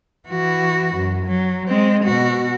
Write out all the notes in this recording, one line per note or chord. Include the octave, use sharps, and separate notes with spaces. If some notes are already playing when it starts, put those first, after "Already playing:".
E3 F#4
F#2
F#3
G#3 C4
B2 F#4